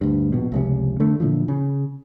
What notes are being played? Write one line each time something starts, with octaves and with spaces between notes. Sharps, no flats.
D2 G2
A#1 B2
F1 C#2 C3
D3 A3
A#2 D3 E3 F3
C#3